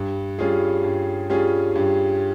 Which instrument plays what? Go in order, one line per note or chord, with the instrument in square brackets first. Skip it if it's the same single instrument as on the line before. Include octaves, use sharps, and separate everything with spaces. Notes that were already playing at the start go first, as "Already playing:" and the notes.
Already playing: [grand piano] G2
G3 C#4 F4 G#4
G2
G3 C#4 F4 G#4
G2